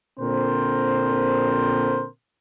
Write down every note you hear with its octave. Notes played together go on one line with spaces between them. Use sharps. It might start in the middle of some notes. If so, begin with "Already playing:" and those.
A#2 D3 C4 A#4 C5